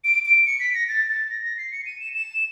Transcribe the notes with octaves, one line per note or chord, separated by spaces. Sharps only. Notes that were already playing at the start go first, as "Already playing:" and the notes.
D7
D7
C#7
B6
A#6
A6
A6
A#6
A#6
C7
C#7
D#7
E7
E7